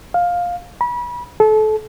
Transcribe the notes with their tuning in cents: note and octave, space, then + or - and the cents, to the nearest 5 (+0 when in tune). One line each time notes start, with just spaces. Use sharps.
F5 +10
B5 -30
A4 -30